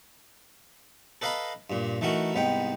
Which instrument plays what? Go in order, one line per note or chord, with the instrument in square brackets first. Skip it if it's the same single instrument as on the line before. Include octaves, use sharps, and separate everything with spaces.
[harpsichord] A4 B4 D#5 F5 A#5 B5
G2 A#2
E3 A3 D#4 E4 F#4 A#4
C2 G#2 B3 D#4 G5